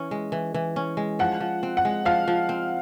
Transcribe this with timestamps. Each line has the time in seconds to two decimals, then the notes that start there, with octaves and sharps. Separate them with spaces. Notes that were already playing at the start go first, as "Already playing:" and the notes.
Already playing: E3 C#4
0.11 G#3
0.32 E3
0.54 E3
0.76 C#4
0.97 G#3
1.19 F3 F#5
1.40 F3
1.63 C4
1.77 F#5
1.85 G#3
2.05 F3 F5
2.28 F3
2.49 C4